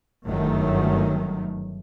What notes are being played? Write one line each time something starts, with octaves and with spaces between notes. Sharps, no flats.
G1 F#2 D#3 F#3 A3